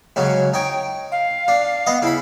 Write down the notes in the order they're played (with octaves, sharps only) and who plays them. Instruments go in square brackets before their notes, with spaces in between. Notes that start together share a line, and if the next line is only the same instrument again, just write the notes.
[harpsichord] G#2 C#3 F#3 [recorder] C#5
[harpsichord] D#4 C#5 [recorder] G5
[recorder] F5
[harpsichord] D4
B3 D#5
[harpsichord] C#3 B5 [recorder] E4